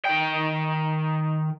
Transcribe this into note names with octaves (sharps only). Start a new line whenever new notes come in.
D#3 G5